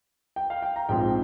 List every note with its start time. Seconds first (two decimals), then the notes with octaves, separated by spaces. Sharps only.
0.36 G5
0.50 F5
0.62 G5
0.76 A#5
0.89 A#1 G#2 F3 C4 G5